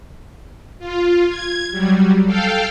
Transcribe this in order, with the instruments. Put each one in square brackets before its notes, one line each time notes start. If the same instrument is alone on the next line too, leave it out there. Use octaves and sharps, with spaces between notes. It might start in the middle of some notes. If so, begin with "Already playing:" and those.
[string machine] F4
G#6
F#3 G3
A4 F5 G5